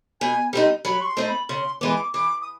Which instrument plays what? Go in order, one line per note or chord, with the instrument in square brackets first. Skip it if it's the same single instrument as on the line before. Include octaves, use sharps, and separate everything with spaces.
[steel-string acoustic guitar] B2 [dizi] G#5
[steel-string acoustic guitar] G3 C4 D#4
[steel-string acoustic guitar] F#3 [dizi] B5
[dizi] C#6
C6
[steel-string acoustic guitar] A3 C4 D#4
[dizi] B5
[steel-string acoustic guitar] C#3 [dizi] C6
[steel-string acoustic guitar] E3 G#3 B3 [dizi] D6
[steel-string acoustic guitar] E3 [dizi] D6
[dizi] D#6